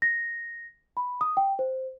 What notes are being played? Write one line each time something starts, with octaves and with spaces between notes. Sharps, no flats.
A#6
B5
D#6
G5
C5